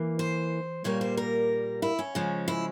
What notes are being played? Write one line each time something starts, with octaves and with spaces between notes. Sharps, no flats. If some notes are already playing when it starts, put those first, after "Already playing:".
Already playing: E3 A#3
C5
A#2 G3 A#3 C#5
C5
A#4
E4
C#4
C#3 F3 G#3
E4